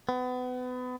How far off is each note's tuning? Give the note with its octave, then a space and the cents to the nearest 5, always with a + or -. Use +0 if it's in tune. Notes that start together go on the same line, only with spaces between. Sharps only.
B3 +30